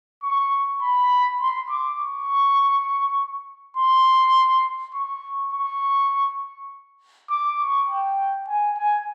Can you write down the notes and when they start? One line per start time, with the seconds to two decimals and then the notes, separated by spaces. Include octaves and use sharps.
0.23 C#6
0.82 B5
1.41 C6
1.70 D6
1.99 C#6
3.77 C6
4.95 C#6
5.53 C#6
7.30 D6
7.59 C#6
7.89 G5
8.48 G#5
8.78 G#5